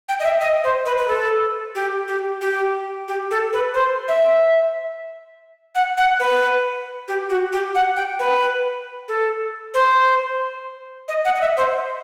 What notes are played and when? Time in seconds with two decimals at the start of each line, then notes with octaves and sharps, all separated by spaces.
0.09 G5
0.20 D#5
0.24 E5
0.41 D#5
0.64 C5
0.85 B4
0.98 B4
1.08 A4
1.75 G4
2.08 G4
2.41 G4
3.08 G4
3.31 A4
3.53 B4
3.74 C5
4.08 E5
5.75 F#5
5.97 F#5
6.19 B4
7.08 G4
7.29 F#4
7.52 G4
7.75 F#5
7.96 G5
8.19 B4
9.08 A4
9.74 C5
11.08 D#5
11.25 F#5
11.35 D#5
11.41 E5
11.57 C5